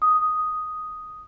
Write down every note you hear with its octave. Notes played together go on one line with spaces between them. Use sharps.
D#6